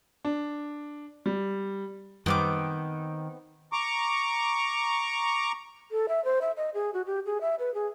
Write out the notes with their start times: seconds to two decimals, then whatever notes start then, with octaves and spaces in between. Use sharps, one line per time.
0.25 D4
1.26 G3
2.26 F#2 D#3 G3 B3 C4 D6 F6
3.73 A#5 C#6 D6
5.91 A4
6.08 E5
6.25 C5
6.41 E5
6.57 D#5
6.74 G#4
6.94 F#4
7.06 G4
7.26 G#4
7.41 E5
7.59 B4
7.74 G#4